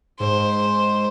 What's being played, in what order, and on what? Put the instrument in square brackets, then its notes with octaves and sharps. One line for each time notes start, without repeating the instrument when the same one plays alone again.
[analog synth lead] G#2 [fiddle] C5